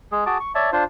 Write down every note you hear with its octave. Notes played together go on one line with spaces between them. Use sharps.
G#3 G#4
F#4 G#4 A5 D6
C#6
C#5 D5 E5 A5
D4 F4 C5